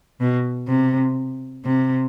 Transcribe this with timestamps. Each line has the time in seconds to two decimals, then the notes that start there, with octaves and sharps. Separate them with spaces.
0.21 B2
0.68 C3
1.65 C3